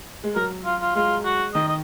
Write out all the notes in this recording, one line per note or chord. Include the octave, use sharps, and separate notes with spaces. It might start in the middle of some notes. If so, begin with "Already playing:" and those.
G#3
F#3 A#4
F4
F4
G#3 F4
F#4
D#3 D#5
D#5